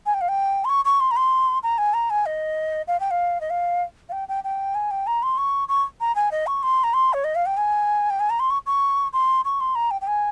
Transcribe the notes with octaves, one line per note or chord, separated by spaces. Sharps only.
G#5
G5
F5
G5
C6
C#6
C#6
C6
A#5
C6
A#5
G#5
A#5
G#5
D#5
F5
G5
F5
D#5
F5
F5
G5
G5
G5
G#5
G5
A#5
C6
C#6
C#6
A#5
G#5
D#5
C#6
C6
A#5
C6
C#5
D#5
F5
G5
G#5
G5
G#5
A#5
C6
C#6
C#6
C6
C#6
C6
A#5
G5
G5
G#5